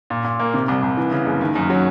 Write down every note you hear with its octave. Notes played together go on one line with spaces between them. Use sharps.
A#2
A#2
A#3
C3
C2
C2
E3
C#3
F#1
D#3
F#2
F#3